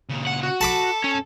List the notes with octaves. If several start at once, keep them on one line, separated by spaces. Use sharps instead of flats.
A#2 C#3
F#5
F#4
A4 A5 B5 D6
C#4